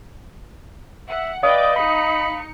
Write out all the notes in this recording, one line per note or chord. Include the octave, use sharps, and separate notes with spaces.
E5 F#5
B4 D5 D#5 F5 G5 D6 D#6
D#4 B5 C#7